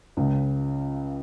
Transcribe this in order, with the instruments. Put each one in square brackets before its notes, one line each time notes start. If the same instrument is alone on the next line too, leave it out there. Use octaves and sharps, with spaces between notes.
[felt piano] C#2 C#3